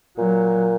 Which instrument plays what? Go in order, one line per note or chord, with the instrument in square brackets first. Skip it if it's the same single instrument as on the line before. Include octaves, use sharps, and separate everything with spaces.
[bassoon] A#2 [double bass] F#3